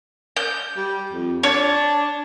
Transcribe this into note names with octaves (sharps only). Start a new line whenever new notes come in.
G6
G3
F2
D4 C#5